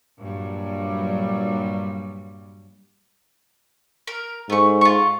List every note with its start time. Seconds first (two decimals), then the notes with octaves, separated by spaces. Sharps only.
0.21 G2 A#2 F#3 G3
4.07 A#4
4.50 G#2 A3 C#6
4.81 F4 C#6